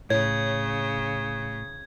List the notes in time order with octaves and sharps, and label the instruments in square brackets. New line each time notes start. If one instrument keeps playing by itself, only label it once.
[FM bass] A2 [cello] C#3 [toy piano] C#5 [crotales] G#6